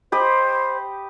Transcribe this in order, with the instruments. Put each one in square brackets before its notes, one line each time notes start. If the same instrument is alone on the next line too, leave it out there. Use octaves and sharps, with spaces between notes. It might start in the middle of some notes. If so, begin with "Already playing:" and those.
[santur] G4 D#5 B5 [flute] C5